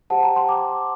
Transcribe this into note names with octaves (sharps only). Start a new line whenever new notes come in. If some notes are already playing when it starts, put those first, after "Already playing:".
G4 C5 F#5 A5
G5 A#5
A5 C6
A#5 D6